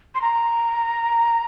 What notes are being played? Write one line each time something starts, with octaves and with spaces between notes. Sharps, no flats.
C6
A#5